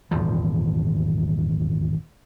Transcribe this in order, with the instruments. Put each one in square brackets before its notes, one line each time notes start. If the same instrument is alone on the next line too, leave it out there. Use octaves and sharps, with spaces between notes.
[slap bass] D#1 G#1 E2 F3